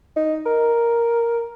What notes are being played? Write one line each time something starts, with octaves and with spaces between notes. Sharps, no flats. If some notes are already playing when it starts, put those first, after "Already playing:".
D#4
A#4